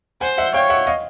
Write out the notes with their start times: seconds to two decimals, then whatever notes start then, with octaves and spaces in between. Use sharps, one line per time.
0.21 C5 F#5 G#5
0.38 E5 F#5
0.54 C#5 F5 G5
0.70 E5 F#5
0.87 D#5 F5